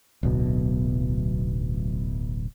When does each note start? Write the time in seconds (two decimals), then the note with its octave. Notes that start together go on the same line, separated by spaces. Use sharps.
0.23 D1 B1 B2